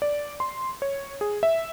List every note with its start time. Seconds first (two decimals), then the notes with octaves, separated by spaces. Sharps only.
0.02 D5
0.40 C6
0.82 C#5
1.21 G#4
1.43 E5